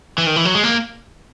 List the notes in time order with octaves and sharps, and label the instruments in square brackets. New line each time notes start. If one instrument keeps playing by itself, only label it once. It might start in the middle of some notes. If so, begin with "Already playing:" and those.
[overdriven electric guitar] E3
D#3
E3
F#3
G#3
A#3